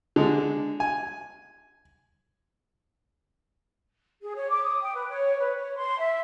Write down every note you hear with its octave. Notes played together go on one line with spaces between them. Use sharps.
D3 G#3
G#5
G#4
C#5
D6
D#6
G5
B4
C#5
B4
C#5
C6
E5